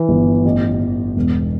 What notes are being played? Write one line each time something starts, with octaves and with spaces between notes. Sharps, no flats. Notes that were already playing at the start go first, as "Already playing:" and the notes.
Already playing: E3
G1
A1
A1
E1